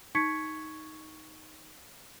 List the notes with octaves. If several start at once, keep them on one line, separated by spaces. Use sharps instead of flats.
D#4 C#6 G#6 B6 C#7